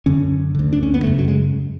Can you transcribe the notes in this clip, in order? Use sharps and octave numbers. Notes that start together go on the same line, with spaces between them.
F#2 D3 C#4
D2 D3
D4
C#4
B3
F#2 C#3 A3
F#3
G#3